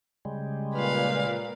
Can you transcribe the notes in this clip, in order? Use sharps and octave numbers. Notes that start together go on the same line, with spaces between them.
C#3 G3 G#3
A#2 B4 F5